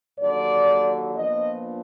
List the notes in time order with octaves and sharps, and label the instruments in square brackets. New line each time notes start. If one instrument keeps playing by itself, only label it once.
[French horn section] D#2 D3 F#3 D5
A#2 F3 B3 D4 D#5